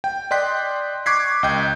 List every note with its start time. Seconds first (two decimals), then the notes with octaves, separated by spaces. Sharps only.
0.04 G5
0.31 D5 D#5 G5 C6 F#6 B6
1.06 C#6 D6 F#6 G#6 B6 C7
1.43 C#2 D#5 G5 G6